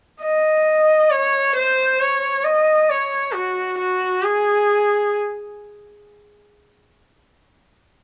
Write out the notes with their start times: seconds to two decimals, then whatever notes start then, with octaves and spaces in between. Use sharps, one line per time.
0.22 D#5
1.11 C#5
1.56 C5
2.00 C#5
2.44 D#5
2.90 C#5
3.33 F#4
3.78 F#4
4.23 G#4